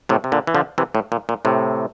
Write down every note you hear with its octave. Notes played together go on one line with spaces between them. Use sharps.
A2 C3
C3
A#2 D3
E3
D3 F3
C3 E3
A2
A#2
A#2
A2 C3